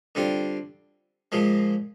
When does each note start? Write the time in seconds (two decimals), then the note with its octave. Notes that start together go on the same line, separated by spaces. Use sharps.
0.15 D3 G3 C4 F4
1.32 A#2 F3 G#3